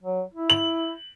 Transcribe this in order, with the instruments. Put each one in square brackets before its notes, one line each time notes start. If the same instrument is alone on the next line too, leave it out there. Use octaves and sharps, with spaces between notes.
[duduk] F#3
E4
[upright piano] F#7